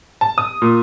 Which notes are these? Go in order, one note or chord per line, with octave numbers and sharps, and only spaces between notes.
A5
D#6
A#2